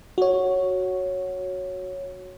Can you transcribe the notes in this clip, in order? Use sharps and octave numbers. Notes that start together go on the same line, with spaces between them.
F#4 C#5